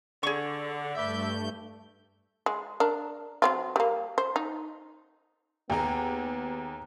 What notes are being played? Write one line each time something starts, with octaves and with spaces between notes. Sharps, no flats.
D3 G#4 C#6
G2 A3 B4 D5 E5 G6
G#3
D4 A#4
F#3 C4 F4
G3 A#3
C5
D#4
D#2 B3 G#4 G5 A#5